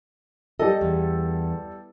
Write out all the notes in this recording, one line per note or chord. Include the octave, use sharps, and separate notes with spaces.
G3 A4 D#5
E2